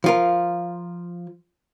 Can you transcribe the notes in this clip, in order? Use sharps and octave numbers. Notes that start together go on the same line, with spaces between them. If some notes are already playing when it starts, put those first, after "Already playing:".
F3 F4 A#4